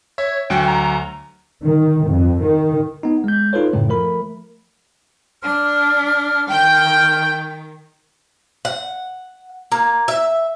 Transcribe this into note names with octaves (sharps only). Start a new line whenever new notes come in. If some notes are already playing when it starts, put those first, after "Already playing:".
C#5 E5
D2 F#3 F#5 G5
A#5
D#3
F2
D#3
B3 D#4
G#3 G6
D#4 F4 A4 B4 C#5
F#2 A2 C#3 A3
F3 A3 A#4 B5
D4 F6
D#3 G5
F#5
A#3
E5